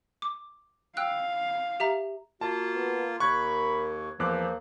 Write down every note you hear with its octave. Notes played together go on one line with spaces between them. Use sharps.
D6
F5 G5 E6 F#6
G4 E5 A#5
A#3 F4 F#4 A5
B3
D#2 A#4 B5 C#6 F#6 G#6
E2 F3 A#3 D6 F#6